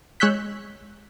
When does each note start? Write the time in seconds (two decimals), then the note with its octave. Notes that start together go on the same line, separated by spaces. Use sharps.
0.20 G#3 C#5 E6 F#6 G6 B6